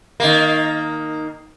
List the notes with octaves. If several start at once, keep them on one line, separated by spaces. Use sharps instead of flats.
D#3 A#3